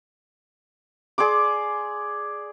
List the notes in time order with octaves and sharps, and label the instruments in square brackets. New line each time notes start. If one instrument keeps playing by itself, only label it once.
[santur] G#4 D5 C6 D6